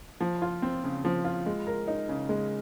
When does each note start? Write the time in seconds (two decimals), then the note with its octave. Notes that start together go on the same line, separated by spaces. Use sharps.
0.21 F3
0.42 F4
0.62 C4
0.84 C#3
1.05 F3
1.24 F4
1.46 G#3
1.67 A#4
1.88 D#4
2.09 C#3
2.29 G#3